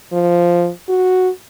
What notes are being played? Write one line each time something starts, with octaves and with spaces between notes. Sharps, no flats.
F3
F#4